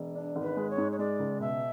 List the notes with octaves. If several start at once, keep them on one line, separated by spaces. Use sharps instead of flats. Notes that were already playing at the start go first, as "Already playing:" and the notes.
Already playing: E1
D4
G#1
B4
G#3
C#5
G#2
C#5
G#3 D5
C#2
B2 E5